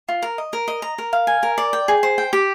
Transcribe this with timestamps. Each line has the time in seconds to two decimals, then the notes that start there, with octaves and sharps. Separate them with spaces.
0.09 F4
0.23 A#4
0.38 D#5
0.53 A#4
0.68 D#5
0.82 A#5
0.98 A#4
1.13 F5
1.27 G#5
1.43 A#4
1.58 D5
1.73 G5
1.88 G#4
2.03 C5
2.18 G5
2.33 G4